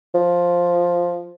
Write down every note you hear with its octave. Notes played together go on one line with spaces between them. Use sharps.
F3